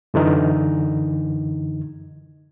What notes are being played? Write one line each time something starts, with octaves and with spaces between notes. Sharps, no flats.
F#2 D3 E3 D#4